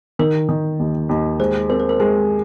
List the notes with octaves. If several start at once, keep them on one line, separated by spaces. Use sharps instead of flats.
D#3 A#4
D#3
D#2
D#2
G#3 C5
C4 A#4
C5
A#4
G#3 A#4